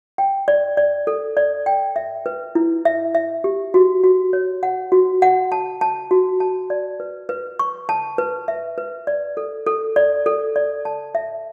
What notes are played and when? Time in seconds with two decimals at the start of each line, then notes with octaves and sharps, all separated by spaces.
0.18 G5
0.48 D5
0.77 D5
1.07 A4
1.37 D5
1.66 G5
1.96 E5
2.26 B4
2.55 E4
2.85 E5
3.15 E5
3.44 G4
3.74 F#4
4.04 F#4
4.33 C#5
4.63 F#5
4.92 F#4
5.22 F#5
5.52 A5
5.81 A5
6.11 F#4
6.40 A5
6.70 D5
7.00 B4
7.29 B4
7.59 C#6
7.89 A5
8.18 B4
8.48 E5
8.78 B4
9.07 D5
9.37 A4
9.66 A4
9.96 D5
10.26 A4
10.56 D5
10.85 A5
11.15 E5